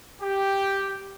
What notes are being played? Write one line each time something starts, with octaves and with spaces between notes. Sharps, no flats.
G4